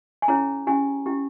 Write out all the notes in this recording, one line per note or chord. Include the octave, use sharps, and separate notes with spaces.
G#5
C#4 E4 G#4 C#5 A#5
C#4 E4 G4 G#5
C#4 E4 G4